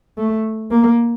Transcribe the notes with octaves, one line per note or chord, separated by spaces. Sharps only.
A3
A#3